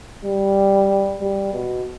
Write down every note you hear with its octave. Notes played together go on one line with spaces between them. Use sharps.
G3
G3
B2